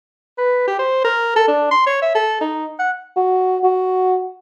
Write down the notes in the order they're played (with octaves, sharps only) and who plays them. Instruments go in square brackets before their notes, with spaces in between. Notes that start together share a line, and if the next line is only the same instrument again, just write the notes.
[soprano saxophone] B4
G4
C5
A#4
A4
D4
C6
C#5
E5
A4
D#4
F#5
[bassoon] F#4
F#4